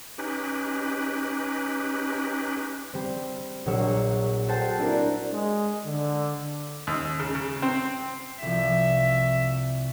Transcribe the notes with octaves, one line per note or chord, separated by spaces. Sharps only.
C#4 D#4 G4 B4
G3 C4
A#1 F#3 F#4 C#5 E6
F#4 A4 C5 F#5 G5 A5
C4 D4 E4 F#4 A#4
G#3
D3
D#2
C#3
C#3
C4
C2 F3 E5